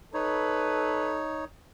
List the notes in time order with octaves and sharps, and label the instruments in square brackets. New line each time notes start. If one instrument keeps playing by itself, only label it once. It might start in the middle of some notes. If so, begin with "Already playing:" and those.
[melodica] D#4 C#5 [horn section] A4 B4